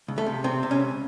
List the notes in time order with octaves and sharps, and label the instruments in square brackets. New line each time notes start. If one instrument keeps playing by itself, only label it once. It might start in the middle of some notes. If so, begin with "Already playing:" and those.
[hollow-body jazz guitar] C#2
A3
C3
C3 C4
C3
C#4
C#2